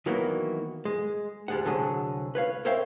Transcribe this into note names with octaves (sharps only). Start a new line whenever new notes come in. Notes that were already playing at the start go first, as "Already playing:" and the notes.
D#3 E3 F#3 A#3 B3 D#4
G#3
D2 G3 G#3 G#4 F#5
C2 D3 F#3 G#4
B4 C#5 F5
A#4 C5 C#5 E5 F5 G5